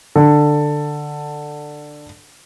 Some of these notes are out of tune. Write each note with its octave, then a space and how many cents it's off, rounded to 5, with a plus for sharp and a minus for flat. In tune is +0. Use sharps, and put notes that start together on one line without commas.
D3 +15 A4 +10